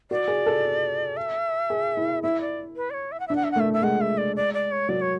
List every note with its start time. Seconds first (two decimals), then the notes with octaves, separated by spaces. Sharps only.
0.11 F#4 D5
0.28 G#4
0.46 A4
1.17 E5
1.70 G#4
1.97 E4
2.23 E4 E5
2.41 D5
2.76 B4
2.90 D5
2.94 C#5
3.12 E5
3.20 F#5
3.27 D4 E5
3.36 F#5
3.44 E5
3.51 F#5
3.56 A3 E5
3.73 E5
3.82 G#3 F#5
4.01 E5
4.18 D5
4.36 D5
4.54 D5
4.72 C#5
4.89 F#3 D5
5.01 C#5